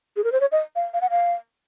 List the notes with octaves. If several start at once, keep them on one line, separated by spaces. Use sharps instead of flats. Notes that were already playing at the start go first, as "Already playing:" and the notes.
G#4
A#4
C5
C#5
D#5
F5
F5
F#5
F5